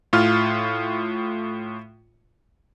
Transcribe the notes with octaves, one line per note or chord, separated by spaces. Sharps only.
A2 F4 F6